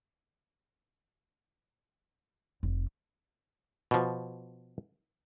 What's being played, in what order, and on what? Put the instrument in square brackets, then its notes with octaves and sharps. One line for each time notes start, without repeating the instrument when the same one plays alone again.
[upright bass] F1
[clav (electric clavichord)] B2 F3